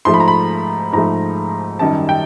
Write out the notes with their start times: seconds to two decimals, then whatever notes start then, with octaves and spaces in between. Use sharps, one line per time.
0.05 G#2 F3 A3 C6
0.14 B5
0.20 A#5
0.28 B5
0.92 G#2 F3 A3 A#5
1.79 F#2 D#3 G3 A5
2.09 G5